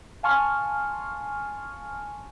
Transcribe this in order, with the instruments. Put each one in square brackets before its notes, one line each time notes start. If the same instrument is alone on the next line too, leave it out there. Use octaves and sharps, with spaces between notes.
[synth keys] F5 G#5 A5 C6 C#6 F6